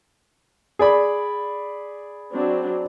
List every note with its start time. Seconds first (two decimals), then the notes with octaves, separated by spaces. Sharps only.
0.79 G#4 D5 B5
2.33 F#3 C4 D4